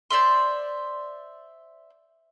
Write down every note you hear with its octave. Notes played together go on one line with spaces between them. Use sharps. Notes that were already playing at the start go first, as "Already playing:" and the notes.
C5 D5 E5 C6